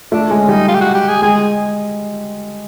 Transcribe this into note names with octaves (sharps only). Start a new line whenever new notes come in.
A3 D4
G#3 C#4
G3 D#4
F4
G4
F#4
G4
G#4
G#3 G#4